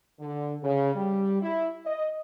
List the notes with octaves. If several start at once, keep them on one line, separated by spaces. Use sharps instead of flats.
D3
C#3
G3
E4
D#5